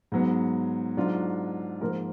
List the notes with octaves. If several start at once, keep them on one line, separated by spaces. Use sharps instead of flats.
G#2 F#3 B3
G#2 F#3 D4 F4
G#2 F3 A#3 F4 A#4